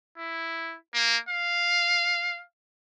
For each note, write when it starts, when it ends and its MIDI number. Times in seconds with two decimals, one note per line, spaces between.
0.18 0.76 64
0.94 1.18 58
1.29 2.42 77